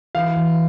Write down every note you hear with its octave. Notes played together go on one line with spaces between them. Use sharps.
E3 F5
E2